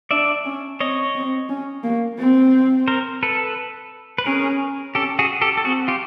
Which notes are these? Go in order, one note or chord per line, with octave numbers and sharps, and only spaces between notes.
D4 D5 E5
C#4
C4 C#5 D#5
C4
C#4
A#3
C4
A#4 C5
A4 B4
B4
C#4 G#4 A#4
C#4 G4 A4
F#4 G#4
G4 A4
A4
C4 F#4 G#4
F4 G4